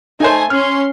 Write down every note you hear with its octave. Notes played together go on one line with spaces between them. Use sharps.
A3 D#4 C5 G#5
C#4 C6 F6